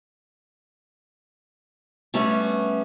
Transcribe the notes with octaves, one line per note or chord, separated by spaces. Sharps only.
G3 A3 B3 C#4